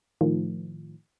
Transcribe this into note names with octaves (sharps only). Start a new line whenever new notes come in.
A2 D#3 F3